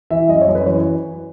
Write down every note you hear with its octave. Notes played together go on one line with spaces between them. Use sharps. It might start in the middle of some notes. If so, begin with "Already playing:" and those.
E3 E5
F#2 D#5
C#5
F#2
B4
E3 C#5